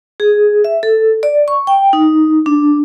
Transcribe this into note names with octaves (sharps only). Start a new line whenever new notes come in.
G#4
E5
A4
D5
C#6
G5
D#4
D4